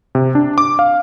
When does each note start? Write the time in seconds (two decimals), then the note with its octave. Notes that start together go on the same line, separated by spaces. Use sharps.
0.15 C3
0.35 D4
0.58 D6
0.79 F5